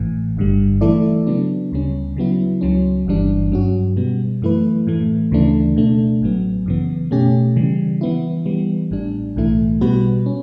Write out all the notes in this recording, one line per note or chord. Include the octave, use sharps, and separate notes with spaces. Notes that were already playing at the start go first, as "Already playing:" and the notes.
Already playing: A1 A2 E3
G1 G2 D3 G3
E3 A3 E4 A4 D5
C#3 F#3 B3 D4
D2 C#3 G3 C#4
C#3 F#3 B3 E4
C#2 C#3 F#3 C#4
G1 G2 E3 G3 D4
G2 F#3 C#4 F#4
B2 G3 B3
F#2 E3 A3 E4 B4
A2 E3 A3
D2 C#3 E3 A3 D4
B2 A3 D4
A1 A2 F#3 B3
F#2 C#3 E3 B3
B2 A3 C#4 G4
C#3 E3 G3
E3 B3 E4
E3 G3 B3
A1 A2 G3 D4
B1 A2 E3 A3 E4
B2 G3 B3 F#4 B4
C#4